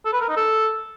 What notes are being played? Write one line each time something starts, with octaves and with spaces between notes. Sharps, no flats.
A4
B4
A#4
D#4
A4